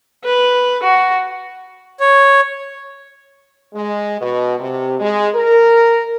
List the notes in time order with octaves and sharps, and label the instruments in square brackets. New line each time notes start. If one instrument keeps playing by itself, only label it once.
[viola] B4
F#4
[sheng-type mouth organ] C#5
[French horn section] G#3
B2
C3
G#3
A#4